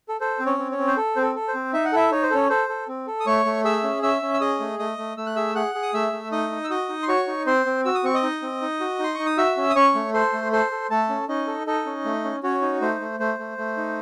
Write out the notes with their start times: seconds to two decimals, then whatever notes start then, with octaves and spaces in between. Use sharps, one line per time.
0.09 A4
0.21 A4 C5
0.39 C4
0.46 C#4 C#5
0.59 C4
0.71 C#4 C#5
0.78 C4
0.87 C5
0.97 A4
1.16 C4 C5
1.22 A4
1.35 A4
1.48 C5
1.54 C4
1.73 D#4 E5
1.85 F#5
1.92 E4 A4 E5
2.12 D#4 C#5
2.23 C5
2.30 C#4 A4 C#5
2.49 A4 C5
2.69 A4
2.88 C4
3.07 A4
3.20 D#6
3.26 A3 C#5 C#6
3.45 A3
3.64 G#4 E5 E6
3.83 C#4
4.03 C#4 E5 E6
4.22 C#4
4.34 E6
4.41 G#4 D#5 D#6
4.60 A3
4.79 A3 D#5 D#6
4.98 A3
5.17 A3 E6
5.26 F#6
5.36 G#4 E5 E6
5.55 G#4 F#5 F#6
5.75 G#4
5.83 D#6
5.94 A3 E5 E6
6.13 A3
6.32 D#4 D#5 D#6
6.51 D#4
6.64 E6
6.70 F#4 D#5 D#6
6.89 D#4
7.03 C6
7.08 F#4 C#5 C#6
7.27 D#4
7.46 C4 C5 C6
7.66 C4
7.85 F#4 E6
7.95 D#6
8.04 C4 C#6
8.14 D#5 D#6
8.23 D#4
8.42 C4
8.62 D#4
8.80 F#4
8.99 D#4 C6
9.15 D#4 C#6
9.26 D#6
9.37 F#4 E5 E6
9.57 C#4
9.70 D#6
9.75 C#4 C#5 C#6
9.95 A3
10.14 A4 C5 C6
10.33 A3
10.52 A4 C5 C6
10.71 A4
10.90 A3 A4 A5
11.09 C#4
11.28 C#4 D#4 D#5
11.47 A4
11.67 D#4 A4 D#5
11.86 C#4
12.05 A3
12.24 C#4
12.43 C#4 F#4 C#5
12.62 D#4
12.81 A3 C5
13.00 A3
13.19 A3 C5
13.39 A3
13.58 A3
13.77 D#4